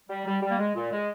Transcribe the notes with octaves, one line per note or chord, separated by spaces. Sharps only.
G3
G3
G3
A#3
G#3
A#2
G#3